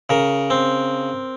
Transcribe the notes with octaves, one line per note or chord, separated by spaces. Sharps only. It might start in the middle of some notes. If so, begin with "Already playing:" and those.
C#3 A#4
C4